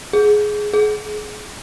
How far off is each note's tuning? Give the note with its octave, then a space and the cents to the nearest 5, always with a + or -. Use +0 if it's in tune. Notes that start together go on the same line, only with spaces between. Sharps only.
G#4 +10
G#4 +30